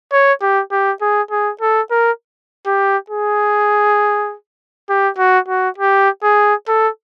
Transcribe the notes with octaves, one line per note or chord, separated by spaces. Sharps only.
C#5
G4
G4
G#4
G#4
A4
A#4
G4
G#4
G4
F#4
F#4
G4
G#4
A4